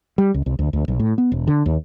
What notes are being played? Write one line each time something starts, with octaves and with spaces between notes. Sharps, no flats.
G3
C#2
C2
D2
D2
B1
A2
B3
E1
D3
D#2